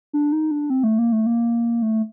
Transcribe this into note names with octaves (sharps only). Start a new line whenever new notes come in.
D4
D#4
D4
C4
A3
A#3
A3
A#3
A3